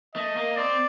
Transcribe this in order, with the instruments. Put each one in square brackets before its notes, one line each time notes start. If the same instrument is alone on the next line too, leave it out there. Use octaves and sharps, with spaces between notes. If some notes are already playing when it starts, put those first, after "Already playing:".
[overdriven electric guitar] A3 [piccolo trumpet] D#5
[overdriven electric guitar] A#3
[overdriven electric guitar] C4 [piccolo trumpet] D5